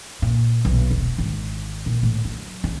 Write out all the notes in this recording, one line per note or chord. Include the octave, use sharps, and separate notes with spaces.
A#2
B1
E1
G#1
A#2
A2
F#3
C#3